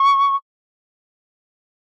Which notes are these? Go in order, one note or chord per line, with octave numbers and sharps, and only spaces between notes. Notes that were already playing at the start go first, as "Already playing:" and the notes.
Already playing: C#6